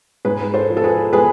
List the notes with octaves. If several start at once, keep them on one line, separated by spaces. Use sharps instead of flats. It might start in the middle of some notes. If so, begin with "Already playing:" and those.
G#2 G#4 B4
A4 C5
F3
A4
G#4 B4
G#3 G#4 B4